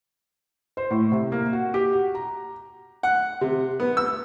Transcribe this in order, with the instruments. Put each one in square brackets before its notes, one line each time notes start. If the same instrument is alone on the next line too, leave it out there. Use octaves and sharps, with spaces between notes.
[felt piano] C5
A2
C3
A#3
F#4
G4
F#4
A#5
[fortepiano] F#5
C3
B3
E6